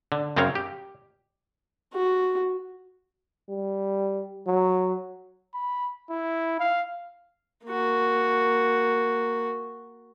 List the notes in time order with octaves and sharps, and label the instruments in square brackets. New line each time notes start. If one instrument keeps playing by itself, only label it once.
[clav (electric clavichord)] D3
F#2 C#3 C4 A#4 C#5 F5
G4
[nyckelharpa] F#4
[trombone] G3
F#3
[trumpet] B5
E4
F5
[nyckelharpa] A#3 F#4